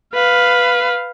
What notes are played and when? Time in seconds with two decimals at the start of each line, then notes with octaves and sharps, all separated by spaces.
0.14 B4 F5